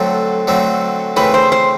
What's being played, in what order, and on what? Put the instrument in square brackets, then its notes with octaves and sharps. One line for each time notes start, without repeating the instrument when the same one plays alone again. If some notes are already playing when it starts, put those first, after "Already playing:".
Already playing: [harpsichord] D3 F#3 A3 C4 [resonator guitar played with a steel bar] A4
[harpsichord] D3 F#3 A3 C4
[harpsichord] C#3 E3 A3 C4 [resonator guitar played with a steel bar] B4
[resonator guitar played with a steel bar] C5
C5